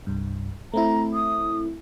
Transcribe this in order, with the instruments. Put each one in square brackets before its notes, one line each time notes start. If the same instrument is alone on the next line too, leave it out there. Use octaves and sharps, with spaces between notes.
[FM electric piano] C2 G2
[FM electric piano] A3 C4 E4 [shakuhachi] A#5
[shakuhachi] D#6